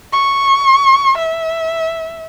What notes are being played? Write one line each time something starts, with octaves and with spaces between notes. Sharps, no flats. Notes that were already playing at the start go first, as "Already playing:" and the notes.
C#6
E5